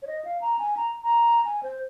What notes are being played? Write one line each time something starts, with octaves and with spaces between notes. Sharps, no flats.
C#5
D#5
F5
A#5
G#5
A#5
A#5
G#5
C5